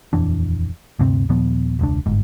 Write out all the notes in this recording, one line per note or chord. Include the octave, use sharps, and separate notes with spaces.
D#1 F2 E3 D4
D2 G2 C3 C4
D#2 A#2 F3 B3
E1 C#2 D4
G1 G#2